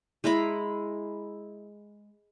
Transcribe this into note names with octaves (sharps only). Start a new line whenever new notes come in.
G#3 E4 A#5 B5